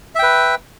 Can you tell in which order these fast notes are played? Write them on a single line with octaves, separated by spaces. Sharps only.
E5 G5 B4